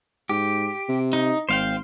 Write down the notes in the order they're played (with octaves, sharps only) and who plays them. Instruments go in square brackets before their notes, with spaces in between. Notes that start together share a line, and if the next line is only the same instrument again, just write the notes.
[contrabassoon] G#2 [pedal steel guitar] G4
[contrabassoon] C3
[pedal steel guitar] D#4
[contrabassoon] G#1 [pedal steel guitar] C5 F5 G5